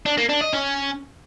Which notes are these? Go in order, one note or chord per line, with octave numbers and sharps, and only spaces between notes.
D4
A#3
D4
D#5
C#4